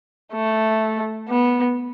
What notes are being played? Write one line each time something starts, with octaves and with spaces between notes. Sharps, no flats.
A3
B3